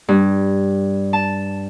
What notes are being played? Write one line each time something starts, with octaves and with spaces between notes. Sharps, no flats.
G2
A5